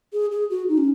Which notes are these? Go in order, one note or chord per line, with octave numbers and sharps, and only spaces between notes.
G#4
G#4
F#4
D#4
C#4